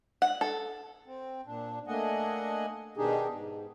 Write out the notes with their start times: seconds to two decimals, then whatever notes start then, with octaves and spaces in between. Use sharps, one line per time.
0.22 F#5
0.41 A4
1.06 C4
1.46 A#2 D4
1.88 A3 A#3 D4 D#5 F#5 G#5
2.97 B2 D#3 D4 D#4 G4 G#4
3.31 G#2